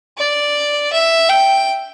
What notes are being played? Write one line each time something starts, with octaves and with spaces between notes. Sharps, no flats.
D5
E5
G5